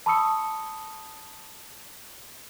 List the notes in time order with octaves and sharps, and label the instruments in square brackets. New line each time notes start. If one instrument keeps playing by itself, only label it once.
[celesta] A5 B5 C#6 D#6 E6 C#7